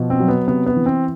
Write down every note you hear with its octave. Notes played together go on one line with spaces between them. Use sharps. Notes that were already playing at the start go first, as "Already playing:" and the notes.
Already playing: B2 F3
C4
F#3
B3
C3 B3
B3
E3
C4